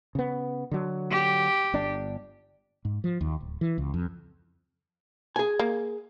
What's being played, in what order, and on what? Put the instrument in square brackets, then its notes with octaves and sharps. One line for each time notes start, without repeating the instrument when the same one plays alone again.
[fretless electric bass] C#3 B3
D3 F#3
[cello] G4
[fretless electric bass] G1 D4
G#2
F3
D#2
D1
E3
C#2
F2
[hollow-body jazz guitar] G#4 G#5
[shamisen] A#3